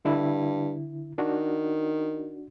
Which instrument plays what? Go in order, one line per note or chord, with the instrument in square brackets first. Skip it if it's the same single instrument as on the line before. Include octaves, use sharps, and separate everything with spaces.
[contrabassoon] G2 [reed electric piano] D3 E4
[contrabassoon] D#3 [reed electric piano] D4 F#4